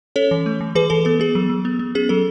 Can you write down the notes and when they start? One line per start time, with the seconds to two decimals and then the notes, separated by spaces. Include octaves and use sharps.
0.16 C#4 A4 C#5
0.31 E3
0.46 A3
0.61 E3
0.75 E3 G#4 B4
0.90 E3 A4
1.05 B3 A4
1.20 B3 G#4
1.35 F#3
1.49 F#3
1.65 B3
1.79 B3
1.95 C#4 G#4
2.09 F#3 A4